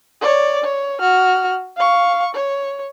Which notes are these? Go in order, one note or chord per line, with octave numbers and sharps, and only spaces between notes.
C#5 D5
C#5
F#4 F6
F5 C#6
C#5